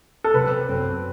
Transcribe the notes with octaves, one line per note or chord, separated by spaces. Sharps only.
A4
C3 F#3 C4 B4
F#2 F#3 C4